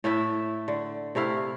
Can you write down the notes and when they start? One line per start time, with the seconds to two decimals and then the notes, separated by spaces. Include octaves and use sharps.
0.04 A2 A3 E4 E5
0.68 D3
1.15 C3 A3 E4 F5